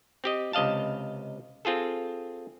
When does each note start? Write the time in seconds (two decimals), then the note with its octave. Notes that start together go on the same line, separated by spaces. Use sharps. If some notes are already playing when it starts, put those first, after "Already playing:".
0.24 C4 G4 D#5
0.53 C#2 C3 D#5 F5 A5
1.65 C4 F4 G#4 A4